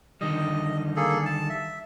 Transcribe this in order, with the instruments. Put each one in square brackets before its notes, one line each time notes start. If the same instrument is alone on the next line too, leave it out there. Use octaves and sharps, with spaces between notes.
[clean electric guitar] D3 D#3 G3 [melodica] D#5
[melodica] A#3 G#4 A4
A5
E5